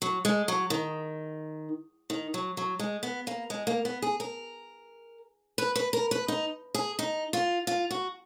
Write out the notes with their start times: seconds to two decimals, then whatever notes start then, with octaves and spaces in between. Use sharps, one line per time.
0.02 F#3
0.25 G#3
0.48 F#3
0.70 D#3
2.10 D#3
2.34 F#3
2.57 F#3
2.79 G#3
3.03 B3
3.27 A#3
3.50 G#3
3.67 A#3
3.85 B3
4.02 G#4
4.20 A#4
5.58 B4
5.75 B4
5.93 A#4
6.11 B4
6.28 D#4
6.75 G#4
6.99 D#4
7.33 F4
7.67 F4
7.91 F#4